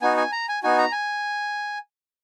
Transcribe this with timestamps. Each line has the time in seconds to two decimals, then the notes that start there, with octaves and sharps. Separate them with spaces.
0.02 B3 D#4 F#4 G#5
0.17 G#5
0.32 A#5
0.49 G#5
0.63 B3 D#4 F#4 G#5
0.78 A#5
0.92 G#5